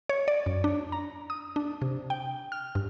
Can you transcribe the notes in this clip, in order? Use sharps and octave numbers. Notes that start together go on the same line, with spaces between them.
C#5
D5
F#2
D4
A#5
D#6
D4
C3
G5
F6
G2